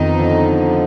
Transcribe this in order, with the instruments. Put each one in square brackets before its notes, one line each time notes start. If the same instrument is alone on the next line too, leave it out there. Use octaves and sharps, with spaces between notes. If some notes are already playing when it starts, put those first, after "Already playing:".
Already playing: [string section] F2 D#3 B3 D#4
[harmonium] D3 F3